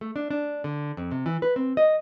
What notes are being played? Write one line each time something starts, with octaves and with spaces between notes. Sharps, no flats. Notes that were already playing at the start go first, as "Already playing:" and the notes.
A3
D4
D4
D3
F2
C3
E3
B4
C4
D#5